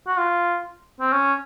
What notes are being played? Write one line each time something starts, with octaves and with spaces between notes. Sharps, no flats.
F#4
F4
C4
C#4